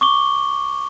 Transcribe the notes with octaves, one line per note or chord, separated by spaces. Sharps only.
C#6 D6 G7